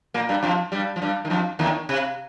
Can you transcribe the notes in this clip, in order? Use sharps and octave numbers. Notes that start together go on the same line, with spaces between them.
A#2 A#3
G2 G3
F2 F3
G2 G3
F3
G2 G3
D#3
F2 F3
D#2 D#3
C3